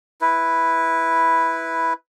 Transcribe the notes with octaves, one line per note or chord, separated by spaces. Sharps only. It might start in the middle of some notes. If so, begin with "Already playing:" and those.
E4 B4